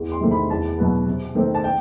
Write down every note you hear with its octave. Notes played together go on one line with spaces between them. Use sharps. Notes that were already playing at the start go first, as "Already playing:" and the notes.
Already playing: E2
C6
C3 D#3 A3
B5
E2 A5
B2 F#3 B3
C3
D#3 A3 C4
A5
G5